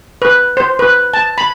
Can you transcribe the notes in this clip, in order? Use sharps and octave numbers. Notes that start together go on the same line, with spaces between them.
B4
C5
B4
A5
B5